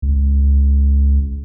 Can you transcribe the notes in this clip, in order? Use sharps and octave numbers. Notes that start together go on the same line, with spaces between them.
C#2